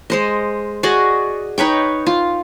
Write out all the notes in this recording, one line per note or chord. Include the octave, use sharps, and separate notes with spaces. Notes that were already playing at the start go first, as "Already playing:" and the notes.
G#3 C5 D#5
F#4 G#4 D5 D#5
D#4 B4 C#5 G5
F4